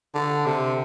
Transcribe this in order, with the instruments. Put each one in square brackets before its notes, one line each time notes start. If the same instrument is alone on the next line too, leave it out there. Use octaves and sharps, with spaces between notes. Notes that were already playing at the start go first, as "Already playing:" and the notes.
[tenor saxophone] D3
C3